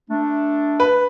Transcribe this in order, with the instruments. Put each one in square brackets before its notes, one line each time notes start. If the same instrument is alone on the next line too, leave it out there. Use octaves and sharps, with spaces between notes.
[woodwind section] A3 D4
[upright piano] B4